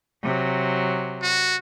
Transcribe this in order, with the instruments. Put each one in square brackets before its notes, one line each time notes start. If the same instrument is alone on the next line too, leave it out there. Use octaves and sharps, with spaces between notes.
[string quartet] C3 F#3
[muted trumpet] F#4